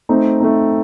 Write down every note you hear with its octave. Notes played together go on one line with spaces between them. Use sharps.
A3 C4 D#4
A3 C4 D#4